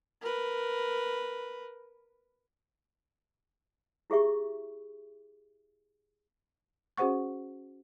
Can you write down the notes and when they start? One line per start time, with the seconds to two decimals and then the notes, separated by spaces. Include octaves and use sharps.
0.21 A#4 B4
4.10 E4 G4 G#4 E5 C#6
6.97 C#4 F#4 G#4 C5 F#5 C#6